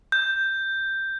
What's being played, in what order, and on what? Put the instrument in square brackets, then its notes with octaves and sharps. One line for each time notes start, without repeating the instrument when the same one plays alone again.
[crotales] G6